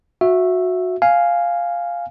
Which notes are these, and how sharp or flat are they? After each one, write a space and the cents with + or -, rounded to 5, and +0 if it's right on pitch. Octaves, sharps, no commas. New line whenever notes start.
F#4 -20 E5 +5
F5 +0 G#5 +0